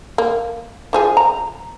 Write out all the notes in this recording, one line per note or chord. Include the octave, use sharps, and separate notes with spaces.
A#3
E3 F3 G#4
A#5